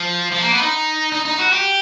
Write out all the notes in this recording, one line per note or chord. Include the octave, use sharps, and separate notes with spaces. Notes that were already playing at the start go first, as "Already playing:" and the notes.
Already playing: F3
F3
A#3
B3
D#4
D#4
D#4
F#4
G4